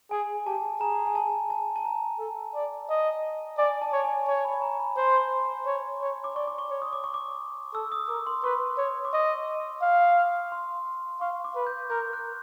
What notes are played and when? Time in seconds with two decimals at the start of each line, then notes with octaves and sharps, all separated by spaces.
0.11 G#4 G#5
0.46 G4 A5
0.80 G#4 A#5
1.07 G#5
1.15 A5
1.50 A5
1.76 A5
1.85 A#5
2.19 A4
2.55 D5
2.89 D#5
3.58 D5 G#5
3.82 A5
3.93 C#5
4.04 G#5
4.27 C#5 A5
4.45 B5
4.62 A#5
4.80 B5
4.97 C5 C6
5.66 C#5
6.01 C#5
6.24 D6
6.36 D5 C#6
6.48 D6
6.58 C#6
6.70 C#5
6.82 D#6
6.93 D6
7.04 C#6
7.14 D6
7.74 A4 E6
7.92 D#6
8.09 A#4 D6
8.27 C6
8.44 B4 C#6
8.78 C#5
9.05 D6
9.13 D#5 C#6
9.82 F5
10.52 C6
11.21 F5 C#6
11.44 D6
11.56 B4
11.67 G6
11.90 A#4 G6
12.13 F#6